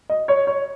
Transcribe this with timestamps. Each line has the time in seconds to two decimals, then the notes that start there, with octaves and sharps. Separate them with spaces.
0.10 D#5
0.28 C#5
0.47 C#5